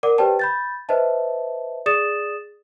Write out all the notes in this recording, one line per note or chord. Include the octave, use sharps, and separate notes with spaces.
A#4 D5 F#5 D6
G4 B4 C5 D5 G5 A5
B5 G6 A6
B4 C5 D#5 E5 A5
G#4 D5 D#6 A6 E7